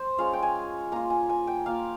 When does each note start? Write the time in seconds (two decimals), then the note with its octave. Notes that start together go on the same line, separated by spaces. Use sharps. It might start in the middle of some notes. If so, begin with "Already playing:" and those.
Already playing: C5
0.18 G#3 C#4 F4 F5
0.33 G5
0.43 G#5
0.92 A#3 F4 A#5
1.10 G#5
1.29 G#5
1.47 G5
1.66 A#3 F4 F5